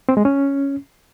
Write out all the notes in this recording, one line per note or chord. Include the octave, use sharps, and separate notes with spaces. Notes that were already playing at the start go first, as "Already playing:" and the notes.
C4
G#3
C#4